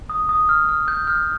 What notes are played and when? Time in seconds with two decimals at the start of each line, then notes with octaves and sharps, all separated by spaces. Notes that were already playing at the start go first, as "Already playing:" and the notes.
0.10 D#6
0.29 D#6
0.49 F6
0.69 F6
0.88 G6
1.07 F6